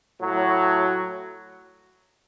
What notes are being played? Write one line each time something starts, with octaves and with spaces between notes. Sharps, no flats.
A2 F#3